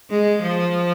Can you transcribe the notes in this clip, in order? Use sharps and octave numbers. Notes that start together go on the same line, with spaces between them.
G#3
F3